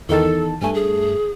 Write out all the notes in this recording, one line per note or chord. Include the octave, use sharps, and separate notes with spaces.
E2 D#3 A4 A5
G2 A3 G#5
G#4